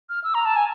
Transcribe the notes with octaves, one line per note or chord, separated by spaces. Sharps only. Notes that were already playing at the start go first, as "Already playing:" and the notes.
F6
E6
A#5
A5
G#5